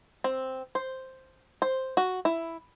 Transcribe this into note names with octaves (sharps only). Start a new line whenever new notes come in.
C4
C5
C5
F#4
E4